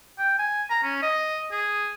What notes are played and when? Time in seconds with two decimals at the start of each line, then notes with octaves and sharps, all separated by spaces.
0.19 G5
0.39 G#5
0.70 A#5
0.83 C#4
1.02 D#5
1.51 G#4